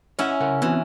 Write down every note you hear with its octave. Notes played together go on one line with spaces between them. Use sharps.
C#4 E4 C#5 D#5 F#5
C#3 A#4 F#5
E3 B3 C4 F#4